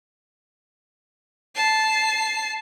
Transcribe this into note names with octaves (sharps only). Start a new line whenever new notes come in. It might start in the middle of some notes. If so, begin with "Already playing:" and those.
A5 C7